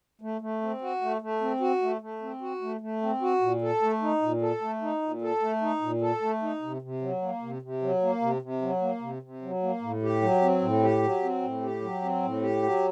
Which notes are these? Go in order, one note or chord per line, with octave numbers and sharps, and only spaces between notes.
A3
A3
C4
F#4
A3
A3
C4
F#4
A3
A3
C4
F#4
A3
A3
C4
F#4
A#2
A4
A3
D#4
A#2
A4
A3
D#4
A#2
A4
A3
D#4
A#2
A4
A3
D#4
C3
C3
F#3
A#3
C3
C3
F#3
A#3
C3
C3
F#3
A#3
C3
C3
F#3
A#3
A2
G4
F#3
C4
A2
G4
F#3
C4
A2
G4
F#3
C4
A2
G4
F#3